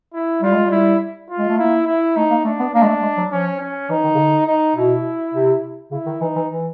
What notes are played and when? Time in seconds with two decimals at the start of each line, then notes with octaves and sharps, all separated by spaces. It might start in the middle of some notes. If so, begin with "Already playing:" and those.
0.13 E4
0.42 G3 F4
0.53 G#3
0.65 G3
0.71 E4
1.29 F4
1.38 G#3
1.48 A3
1.58 A#3 E4
1.87 E4
2.16 A3 D#4
2.30 A#3
2.44 A3 D4
2.60 B3
2.74 A#3 D4
2.83 G#3
2.88 A3
3.02 G#3
3.17 F#3
3.32 F3 C#4
3.60 C#4
3.89 E3 D#4
4.04 D#3
4.15 C#3
4.19 D3
4.47 D#4
4.76 B2 E4
5.34 C3
5.91 C#3 E4
6.06 D#3
6.21 E3 D#4
6.36 E3
6.50 E3